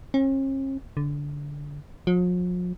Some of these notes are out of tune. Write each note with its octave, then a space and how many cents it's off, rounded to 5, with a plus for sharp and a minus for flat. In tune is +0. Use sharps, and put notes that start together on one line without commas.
C#4 -45
D3 -20
F3 +45